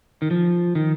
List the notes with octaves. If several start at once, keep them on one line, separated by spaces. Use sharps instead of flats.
D#3
F3
D#3